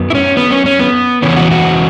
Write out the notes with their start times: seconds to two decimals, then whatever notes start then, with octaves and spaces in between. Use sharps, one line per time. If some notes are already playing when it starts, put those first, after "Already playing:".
Already playing: F#2 F#3 B3
0.10 E4
0.15 C#4
0.37 B3
0.51 C#4
0.66 C#4
0.80 B3
1.22 E2 C#3 E3 B3 C#4
1.37 F#4
1.51 F#4